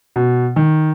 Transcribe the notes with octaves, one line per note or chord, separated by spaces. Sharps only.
B2
D#3